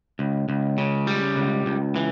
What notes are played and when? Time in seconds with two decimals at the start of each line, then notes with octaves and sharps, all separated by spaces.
0.19 C#2
0.49 C#2
0.78 C#3
1.07 G3
1.36 C#2
1.66 C#2
1.96 E3